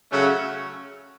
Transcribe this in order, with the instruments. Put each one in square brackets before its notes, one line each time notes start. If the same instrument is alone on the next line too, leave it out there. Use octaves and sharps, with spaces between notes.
[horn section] C#3 F#3 A3 C#4 F#4